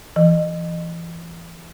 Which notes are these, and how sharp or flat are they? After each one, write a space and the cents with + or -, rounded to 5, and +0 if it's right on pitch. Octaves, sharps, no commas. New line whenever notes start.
E3 +30